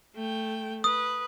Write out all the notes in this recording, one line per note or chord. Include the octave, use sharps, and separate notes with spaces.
A3 G5
B4 D#6